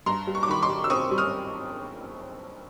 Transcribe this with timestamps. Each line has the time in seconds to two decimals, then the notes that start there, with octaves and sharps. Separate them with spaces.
0.06 G2 A#5 C6
0.27 G3
0.35 C#6
0.43 D6
0.48 D#3 B5 C#6
0.62 C6 D6
0.70 G3
0.84 E6
0.90 C4 C#6 D#6
1.11 G3
1.18 D#6 F6